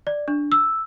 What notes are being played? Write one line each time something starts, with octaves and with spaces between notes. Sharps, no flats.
D5
D4
E6